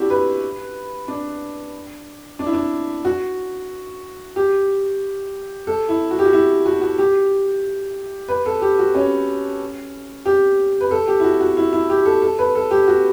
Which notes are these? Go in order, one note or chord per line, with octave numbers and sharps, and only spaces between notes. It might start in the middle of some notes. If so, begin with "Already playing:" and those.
Already playing: D4 E4 F#4 G4
B4
D4
D4
E4
D4
F#4
G4
A4
E4
F#4
G4
F#4
E4
F#4
F#4
G4
B4
A4
G4
F#4
C#4
G4
B4
A4
G4
E4
F#4
F#4
E4
E4
G4
A4
A4
B4
A4
G4
F#4